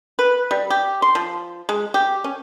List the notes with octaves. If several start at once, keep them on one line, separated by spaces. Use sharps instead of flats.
B4
G3
G4
C6
F3
G#3
G4
C#4